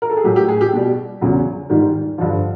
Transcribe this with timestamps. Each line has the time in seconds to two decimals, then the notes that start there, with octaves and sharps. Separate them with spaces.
0.02 A#4
0.09 A4
0.17 G#4
0.24 A2 F#3 G4
0.36 G4
0.49 G#4
0.61 G4
0.73 B2 G3
1.21 E2 C#3 F#3
1.70 G#2 D#3 G3
2.18 G2 D3 F3